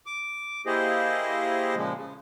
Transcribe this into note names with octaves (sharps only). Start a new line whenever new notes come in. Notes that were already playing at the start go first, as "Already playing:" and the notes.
D6
A#3 E4 G4 G#4 C5 D#5
A#2 C#3 F3 G#3
C#3